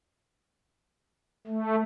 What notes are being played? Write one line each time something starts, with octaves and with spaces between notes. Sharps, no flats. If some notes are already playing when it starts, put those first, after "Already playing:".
A3